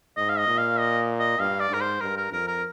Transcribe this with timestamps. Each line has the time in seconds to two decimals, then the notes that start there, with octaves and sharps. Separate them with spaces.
0.17 G#2 D#5
0.29 F5
0.38 D#5
0.47 A#2
0.58 F5
0.78 D#5
1.19 D#5
1.39 G2 F5
1.60 D5
1.70 G#2 A#4
1.81 C5
2.01 G2 A#4
2.17 A#4
2.32 F2 A#4
2.47 A#4